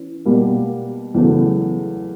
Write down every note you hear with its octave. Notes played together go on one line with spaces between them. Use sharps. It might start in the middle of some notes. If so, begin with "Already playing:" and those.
Already playing: E3 C#4
B2 G3 A#3
E2 C#3 F#3 A3